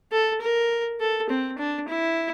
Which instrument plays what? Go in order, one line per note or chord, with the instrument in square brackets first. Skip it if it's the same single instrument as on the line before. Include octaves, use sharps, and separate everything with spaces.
[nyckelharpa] A4
A#4
A4
C4
D4
E4